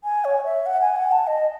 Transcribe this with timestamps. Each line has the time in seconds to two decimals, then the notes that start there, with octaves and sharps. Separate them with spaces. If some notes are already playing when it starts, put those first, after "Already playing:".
0.04 G#5
0.25 C#5
0.45 E5
0.66 F#5
0.82 G#5
0.96 F#5
1.12 A5
1.27 D#5